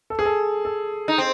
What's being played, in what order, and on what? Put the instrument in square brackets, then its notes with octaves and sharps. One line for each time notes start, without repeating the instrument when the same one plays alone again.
[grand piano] A4
G#4
A4
A4
[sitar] D#4
C4